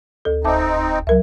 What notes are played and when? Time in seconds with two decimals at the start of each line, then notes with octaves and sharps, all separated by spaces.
0.25 D2 A4
0.44 D#1 C4 D#4 E5 A5 D6
1.07 C#2 F#3 A#4 E5